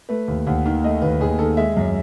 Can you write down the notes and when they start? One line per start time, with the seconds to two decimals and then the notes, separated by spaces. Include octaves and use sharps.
0.09 A3 B4
0.28 D#2
0.47 D#2 F#5
0.66 D#3
0.84 A3 D#5
1.02 D#2 B4
1.20 D#2 G#4
1.39 D#3 A4
1.57 G#3 E5
1.77 F#2